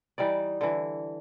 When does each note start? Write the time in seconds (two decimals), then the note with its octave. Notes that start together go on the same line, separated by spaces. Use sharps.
0.18 E3 G3 D#4 D5
0.61 D3 E3